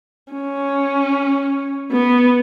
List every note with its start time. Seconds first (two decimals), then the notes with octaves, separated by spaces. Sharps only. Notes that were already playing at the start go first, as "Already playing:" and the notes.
0.33 C#4
1.92 B3